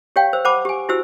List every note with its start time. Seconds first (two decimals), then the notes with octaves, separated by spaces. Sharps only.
0.16 G4 C#5 F5 G5
0.33 C5 E6
0.45 C5 F#5 A5 B5 D6
0.65 G4 G#5
0.89 E4 F#4 G4 C5 E6